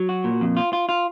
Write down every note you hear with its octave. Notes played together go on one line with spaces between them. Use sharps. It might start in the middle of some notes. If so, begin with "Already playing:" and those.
Already playing: F#3
F#4
A#2
F2
F4
F4
F4